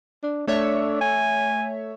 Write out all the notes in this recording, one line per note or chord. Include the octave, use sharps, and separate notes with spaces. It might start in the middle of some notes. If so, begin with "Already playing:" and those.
D4
A3 D4 C#5 E5
G#5